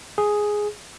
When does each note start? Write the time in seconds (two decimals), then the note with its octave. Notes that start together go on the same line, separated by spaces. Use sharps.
0.18 G#4